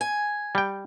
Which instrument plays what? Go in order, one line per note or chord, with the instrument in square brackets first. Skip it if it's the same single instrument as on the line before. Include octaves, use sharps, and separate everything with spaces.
[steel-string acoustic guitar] G#5
[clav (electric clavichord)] G3 G5